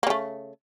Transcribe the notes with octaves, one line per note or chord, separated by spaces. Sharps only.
C#3 A3 A#3